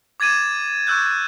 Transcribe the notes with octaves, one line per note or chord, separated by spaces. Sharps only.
D6 G#6 A6 D#7 E7
C#6 D6 E6 F#6 G6